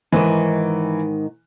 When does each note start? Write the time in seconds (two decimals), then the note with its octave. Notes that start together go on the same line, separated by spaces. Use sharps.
0.12 G#2 D#3 E3